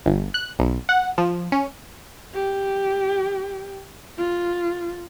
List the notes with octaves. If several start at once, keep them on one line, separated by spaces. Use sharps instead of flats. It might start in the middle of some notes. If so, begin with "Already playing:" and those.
G1
F#6
B1
F#5
F3
C#4
G4
F4